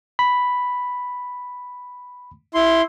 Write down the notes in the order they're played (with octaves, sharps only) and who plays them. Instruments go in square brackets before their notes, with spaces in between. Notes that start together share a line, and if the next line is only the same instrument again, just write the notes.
[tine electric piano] B5
[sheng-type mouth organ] E4 C6